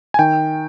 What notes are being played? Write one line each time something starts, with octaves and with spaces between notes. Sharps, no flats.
G#5
D#3 G5